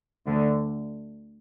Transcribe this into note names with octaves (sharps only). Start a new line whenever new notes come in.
D2 D3